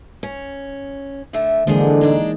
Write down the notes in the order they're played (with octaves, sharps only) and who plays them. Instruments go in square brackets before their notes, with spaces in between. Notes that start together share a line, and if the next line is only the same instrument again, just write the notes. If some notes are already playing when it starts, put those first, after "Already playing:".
[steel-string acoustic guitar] C#4
D3 A3
[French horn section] D3 [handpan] E3 G#3 A#3 [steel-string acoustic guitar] F3 G#4
[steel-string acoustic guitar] G#3 D4 [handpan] D#4